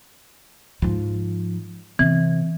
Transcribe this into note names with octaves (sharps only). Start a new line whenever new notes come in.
G#2 F3
C3 E3